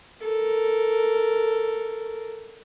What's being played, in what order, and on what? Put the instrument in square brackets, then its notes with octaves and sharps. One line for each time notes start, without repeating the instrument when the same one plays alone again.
[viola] A4 A#4